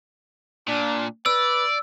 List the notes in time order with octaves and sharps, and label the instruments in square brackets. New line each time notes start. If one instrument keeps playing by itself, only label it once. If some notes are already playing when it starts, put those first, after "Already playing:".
[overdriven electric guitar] A#2 [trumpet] D4
[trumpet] B4 [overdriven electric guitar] D5 [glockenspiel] E6